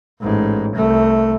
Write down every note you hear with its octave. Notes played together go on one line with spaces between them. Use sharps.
A1 G#2
C2 A3